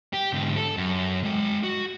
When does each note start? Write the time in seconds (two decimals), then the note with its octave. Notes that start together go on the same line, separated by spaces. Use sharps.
0.13 G4
0.33 G#2 D3
0.56 A4
0.77 F#2
1.24 G#3 G5
1.63 F#4